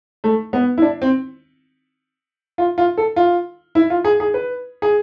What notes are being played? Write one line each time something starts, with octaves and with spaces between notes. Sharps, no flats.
A3
B3
E4
D4
C4
F4
F4
A4
F4
E4
F4
G#4
G#4
B4
G#4